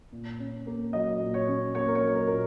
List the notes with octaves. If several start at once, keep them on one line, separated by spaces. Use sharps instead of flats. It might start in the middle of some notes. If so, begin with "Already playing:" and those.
A#2
C#4
A#3
F#3 D#5
A#2
C#5
C#4
A#3 C#5
A#4
C#5
F#3
A#4
A#2 A#4